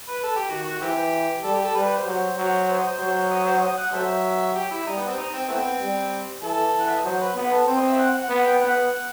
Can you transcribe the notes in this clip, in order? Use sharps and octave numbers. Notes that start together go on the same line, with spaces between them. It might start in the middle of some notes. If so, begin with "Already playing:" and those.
B4
A4
G4
D#3 F#4
F#4
E3 C4 E4 G4
G3 A4
G4
A4
G3 B4
B4
C5
F#3
F#3
C5
D#5
C5
F#3
D#5
C5
D#5
F#5
F#3 A4 C5 E5
G4
E4
G3 D#4
B3
C4
D#4
C4
E3 A3 B3 C4
G3
E3 A4
E3
F#5
E5
D#5
F#3 C5
B4
B3 B4
A4
C4 C5
D#5
E5
F#5
F#5
B3
G5
B3 F#5